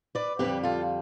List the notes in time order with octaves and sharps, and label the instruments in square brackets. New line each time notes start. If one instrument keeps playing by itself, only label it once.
[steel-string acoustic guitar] B4 D5
F2 D3 G3 G4 B4
F4 A4